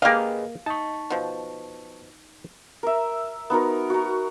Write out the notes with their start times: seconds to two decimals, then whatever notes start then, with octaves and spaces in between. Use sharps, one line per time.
0.02 A#3 G4 G#4 B4 D#5 F5 G5
0.66 D#4 A5 C#6
1.10 B2 F3
2.83 A#4 E5
3.50 B3 D#4 F#4 A#4
3.90 F#4 A#5